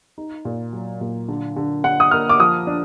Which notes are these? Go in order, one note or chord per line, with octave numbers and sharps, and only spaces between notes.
D#4
A#2
F#3
A#2
D3
D3
D3 F#5
D#6
A#3 F6
D6
F3 D#6
D4